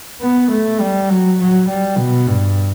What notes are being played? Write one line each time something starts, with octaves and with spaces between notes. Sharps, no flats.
B3
A3
G3
F#3
F#3
G3
B2
G2